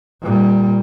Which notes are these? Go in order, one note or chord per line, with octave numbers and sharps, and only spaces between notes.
A#2 G3